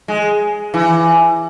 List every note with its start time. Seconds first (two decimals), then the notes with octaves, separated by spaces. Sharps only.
0.08 G#3
0.74 E3